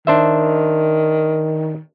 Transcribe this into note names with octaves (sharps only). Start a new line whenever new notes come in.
D#3 D4 C5 E5